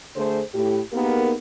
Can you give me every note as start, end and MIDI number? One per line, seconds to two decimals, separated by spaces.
0.15 0.41 50
0.15 0.41 57
0.15 0.41 68
0.15 0.41 72
0.54 0.81 45
0.54 0.81 64
0.54 0.81 67
0.93 1.33 58
0.93 1.33 59
0.93 1.33 63
0.93 1.33 67
0.93 1.33 68
0.93 1.33 70